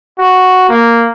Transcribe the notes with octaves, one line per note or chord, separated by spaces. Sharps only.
F#4
A#3